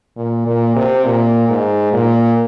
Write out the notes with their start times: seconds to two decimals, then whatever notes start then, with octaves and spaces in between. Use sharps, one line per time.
0.16 A#2
0.46 A#2
0.75 C3
1.05 A#2
1.49 G#2
1.93 A#2